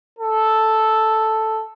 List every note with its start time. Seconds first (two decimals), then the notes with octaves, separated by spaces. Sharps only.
0.19 A4